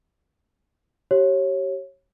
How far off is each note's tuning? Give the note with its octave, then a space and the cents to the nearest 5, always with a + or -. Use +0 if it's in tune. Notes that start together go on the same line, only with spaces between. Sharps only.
G4 -30 C#5 -20